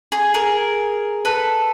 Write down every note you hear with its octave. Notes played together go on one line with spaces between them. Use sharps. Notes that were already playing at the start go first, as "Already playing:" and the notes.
G#4
G#4 A#4
A4 B4